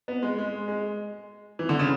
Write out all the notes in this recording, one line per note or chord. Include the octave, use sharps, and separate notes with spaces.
B3
G#3
G#3
G#3
E3
D3
C#3